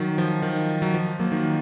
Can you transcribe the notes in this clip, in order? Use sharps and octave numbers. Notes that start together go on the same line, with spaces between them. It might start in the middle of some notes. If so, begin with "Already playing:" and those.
Already playing: D#3 F#3
F3
D#3
F#3
F3
F#3 A#3
D#3